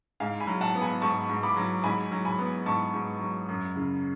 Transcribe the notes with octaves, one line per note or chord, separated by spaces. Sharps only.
G#2 F5 G#5
G#5 B5
F#3
F#5 A5
B3
G#5 B5
G#2 A5 C#6
G#2
B5 D6
F#3
G#2 G#5 B5
F#3
G#5 B5
B3
G#2 A5 C#6
G#2
F#3
F#2
C#3